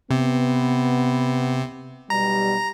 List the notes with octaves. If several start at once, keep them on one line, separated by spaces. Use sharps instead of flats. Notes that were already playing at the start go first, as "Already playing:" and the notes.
C3 B3
B1 B2 G3 A#5